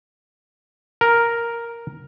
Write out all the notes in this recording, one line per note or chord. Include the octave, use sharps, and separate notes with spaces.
A#4